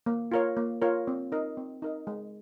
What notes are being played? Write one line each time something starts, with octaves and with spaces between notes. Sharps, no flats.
A#3
F4 A#4 C#5
A#3
F4 A#4 C#5
C4
D#4 A#4 D#5
C4
D#4 A#4 D#5
G#3